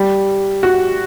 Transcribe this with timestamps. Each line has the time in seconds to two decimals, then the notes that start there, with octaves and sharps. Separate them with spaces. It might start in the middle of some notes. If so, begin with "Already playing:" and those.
Already playing: G3
0.63 F#4